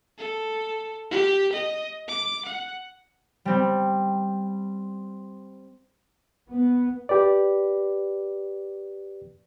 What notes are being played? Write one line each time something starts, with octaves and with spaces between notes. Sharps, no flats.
A4
G4
D#5
D6
F#5
G3 C4
B3
G4 B4 D5